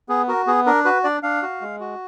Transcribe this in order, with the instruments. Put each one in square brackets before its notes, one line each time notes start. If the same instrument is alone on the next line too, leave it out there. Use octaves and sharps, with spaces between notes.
[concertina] B3 G#4
F#4 A#4
B3 G#4
D4 A#4
F#4 B4
D4 D5
D4 F5
F#4
G#3
F#4